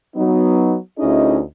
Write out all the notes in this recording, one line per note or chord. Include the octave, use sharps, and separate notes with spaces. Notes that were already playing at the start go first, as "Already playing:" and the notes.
F#3 B3 D#4
D2 C#4 D#4 E4 G#4 D#5